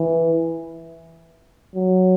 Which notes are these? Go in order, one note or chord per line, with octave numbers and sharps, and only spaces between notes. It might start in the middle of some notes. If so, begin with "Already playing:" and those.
Already playing: E3
F#3